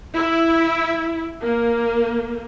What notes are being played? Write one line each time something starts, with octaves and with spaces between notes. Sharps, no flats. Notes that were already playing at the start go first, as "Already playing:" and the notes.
E4
A#3